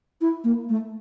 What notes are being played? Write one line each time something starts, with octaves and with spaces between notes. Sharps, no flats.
E4
A#3
A3